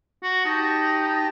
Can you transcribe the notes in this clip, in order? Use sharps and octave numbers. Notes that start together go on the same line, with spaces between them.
F#4
D#4 G4 G5 A5